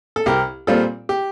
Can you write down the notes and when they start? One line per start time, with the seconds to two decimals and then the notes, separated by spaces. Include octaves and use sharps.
0.16 A4
0.26 C2 G4 A#4
0.67 A#2 G3 C4 F4 A4
1.09 G4